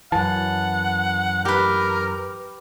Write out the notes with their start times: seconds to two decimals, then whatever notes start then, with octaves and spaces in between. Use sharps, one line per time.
0.12 F#2 E3 F#5 A5
1.45 G4 A#4 B4